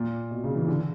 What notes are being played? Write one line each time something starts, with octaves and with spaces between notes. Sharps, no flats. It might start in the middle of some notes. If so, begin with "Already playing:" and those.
Already playing: A#2
B2
C#3
E3
D3